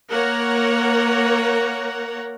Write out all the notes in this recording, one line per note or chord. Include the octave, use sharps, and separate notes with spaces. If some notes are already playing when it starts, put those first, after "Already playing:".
A#3 A#4 C#5 F#5 A#5